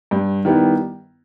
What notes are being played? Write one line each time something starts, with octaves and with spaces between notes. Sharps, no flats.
G2
D#3 G3 B3 E4